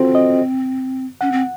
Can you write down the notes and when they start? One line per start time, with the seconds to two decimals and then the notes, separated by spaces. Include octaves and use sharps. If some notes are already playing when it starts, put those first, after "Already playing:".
Already playing: C4 F4 F#4 A4 C5
0.15 D#5
1.21 C#4 F#5
1.32 C4